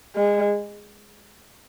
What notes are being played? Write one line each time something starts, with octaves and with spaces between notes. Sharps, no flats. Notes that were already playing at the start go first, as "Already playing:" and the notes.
G#3